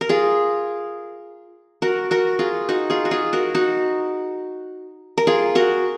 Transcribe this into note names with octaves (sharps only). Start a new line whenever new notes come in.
A#4
F4 G#4
F#4 A#4
F#4 A#4
F4 G#4
D#4 F#4
F4 G#4
F#4
F4 G#4
F#4 A#4
D#4 F#4
A#4
F4 G#4
F#4 A#4